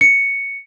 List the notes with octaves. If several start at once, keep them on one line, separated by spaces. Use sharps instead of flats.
C#7